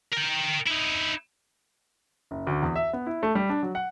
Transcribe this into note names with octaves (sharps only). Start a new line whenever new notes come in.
A#4 G5
D#4 E4
F#1
D2
E2
E5
B3
E4
A3
G3
D4
F#3
F#5